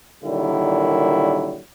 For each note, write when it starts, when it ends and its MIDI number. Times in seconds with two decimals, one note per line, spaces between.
0.24 1.60 46
0.24 1.60 50
0.24 1.60 51
0.24 1.60 54
0.24 1.60 55
0.24 1.60 64